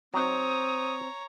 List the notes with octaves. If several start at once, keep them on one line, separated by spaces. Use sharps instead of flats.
F#3 C4 D#4 C#5 A#5 D#6